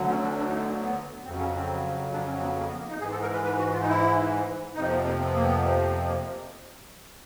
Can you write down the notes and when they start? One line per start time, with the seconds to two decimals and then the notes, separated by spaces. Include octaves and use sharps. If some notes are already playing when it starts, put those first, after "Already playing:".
Already playing: D2 D3 F#3
0.09 C#4
0.23 D4
0.37 D4
0.49 D#4
0.59 B3
0.70 A#3
0.81 B3
1.25 F2 C#3 F#3 C4
1.39 C#4
1.54 C4
2.12 D4
2.27 C#4
2.37 C4
2.42 B3
2.57 A#3
2.67 B3
2.78 A#3
2.89 D#4
3.00 G#2 E3 G#4
3.11 A4
3.22 A#4
3.33 B4
3.44 B4
3.58 F#4
3.73 F4
3.81 D#4
3.88 E4
4.75 F2 C3 F3 D#4
4.90 B3
5.05 A#3
5.19 C4
5.26 B3
5.34 A#3
5.41 B3
6.07 A#3